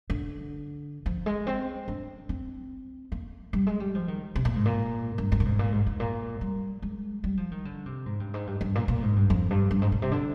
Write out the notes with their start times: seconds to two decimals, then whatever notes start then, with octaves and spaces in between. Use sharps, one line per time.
0.10 D3
1.06 F3
1.26 G#3
1.47 C4
1.88 D4
2.29 C4
3.12 A#3
3.53 G3
3.67 G#3
3.80 G3
3.95 F3
4.08 D#3
4.35 C3
4.45 A#2
4.56 G#2
4.65 A#2
5.18 G2
5.32 G2
5.40 A#2
5.45 G#2
5.59 A#2
5.72 G#2
5.86 G#2
6.00 A#2
6.41 G3
6.82 G#3
7.24 G3
7.37 F3
7.52 D#3
7.65 D3
7.86 C3
8.06 G#2
8.20 G2
8.34 G#2
8.47 G2
8.61 G2
8.75 A#2
8.88 A#2
9.02 G#2
9.16 G2
9.30 F2
9.50 G2
9.71 G2
9.82 G#2
9.92 A#2
10.02 C3
10.12 D3